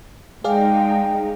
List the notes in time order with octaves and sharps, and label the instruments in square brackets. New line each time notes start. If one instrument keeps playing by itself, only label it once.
[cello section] G#3 D#4 [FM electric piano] G#4 D5 F5 [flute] G5